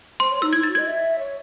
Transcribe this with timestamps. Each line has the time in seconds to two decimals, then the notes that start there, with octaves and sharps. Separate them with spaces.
0.20 C5 C6
0.31 C#5
0.42 D#4 E6
0.53 E4 G#6
0.61 D#4 A6
0.69 F#4
0.75 D#5 G#6
0.86 E5
1.19 C#5